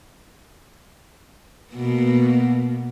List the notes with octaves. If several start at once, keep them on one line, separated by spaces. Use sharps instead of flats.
B2 A#3 B3